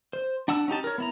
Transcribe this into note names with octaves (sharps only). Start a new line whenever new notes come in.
C5
D4 F#5 A5 E6
C#4 D#4 G4 A5
A#4 C#5
B3 E4 A#5